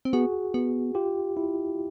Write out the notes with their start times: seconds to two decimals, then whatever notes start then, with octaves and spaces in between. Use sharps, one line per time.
0.05 C4
0.13 B3 F#4 G#4
0.54 B3
0.95 F4 G4
1.37 E4